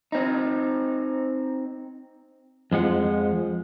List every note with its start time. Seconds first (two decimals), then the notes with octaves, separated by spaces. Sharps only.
0.12 C4 D#4
2.71 F2 F3 G#3 F#5